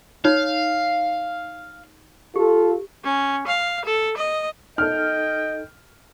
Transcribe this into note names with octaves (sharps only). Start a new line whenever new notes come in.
D#4 C#5 F5
F4 G4 A4
C#4
F5
A4
D#5
D#4 A4 D#5 G5 F6